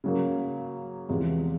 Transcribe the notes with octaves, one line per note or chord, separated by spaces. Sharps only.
C#3 F#3 A#3
E2 C3 F3 G#3 B3